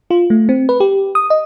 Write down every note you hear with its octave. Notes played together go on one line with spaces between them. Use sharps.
F4
A3
C4
B4
G4
D#6
D#5